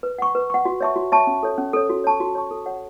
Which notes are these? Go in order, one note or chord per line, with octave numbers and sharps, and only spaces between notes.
B4
F#5 C#6
B4
F#5 C#6
F#4
C#5 E5 A5 C#6
F#4
C#5 E5 A5 C#6
C#4
A4 C#5
C#4
A4 C#5
F#4
C#5 A5 C#6
F#4
C#5 A5 C#6
A4
C#5 F#5